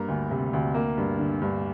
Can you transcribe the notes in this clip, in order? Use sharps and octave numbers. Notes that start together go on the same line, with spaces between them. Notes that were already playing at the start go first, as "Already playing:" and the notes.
Already playing: G2 A#3 A#5
D2
C3
D2
A#3
G2
D3
G2